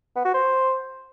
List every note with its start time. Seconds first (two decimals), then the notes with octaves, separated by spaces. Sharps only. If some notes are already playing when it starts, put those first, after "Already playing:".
0.16 B3
0.25 F#4
0.34 C5